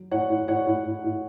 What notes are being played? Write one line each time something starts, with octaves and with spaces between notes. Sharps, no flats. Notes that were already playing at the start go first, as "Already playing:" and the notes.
Already playing: F#3
A2 C#5 F#5
A2
A2 C#5 F#5
A2
A2
A2